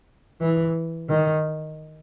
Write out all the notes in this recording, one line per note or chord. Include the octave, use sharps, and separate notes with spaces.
E3
D#3